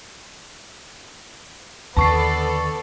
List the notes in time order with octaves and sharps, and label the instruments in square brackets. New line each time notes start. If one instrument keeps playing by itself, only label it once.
[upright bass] D#2 D3 [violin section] B3 A4 D5 [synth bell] A5 C#6 C7